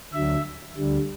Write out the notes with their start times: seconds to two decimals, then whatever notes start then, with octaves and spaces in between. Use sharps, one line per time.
0.13 D2 D3 F#3 E5
0.76 D2 D3 G3